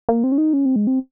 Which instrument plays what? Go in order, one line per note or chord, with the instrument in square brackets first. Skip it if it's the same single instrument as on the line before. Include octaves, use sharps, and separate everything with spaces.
[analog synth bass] A#3
C4
C#4
D#4
C#4
C4
G#3
C4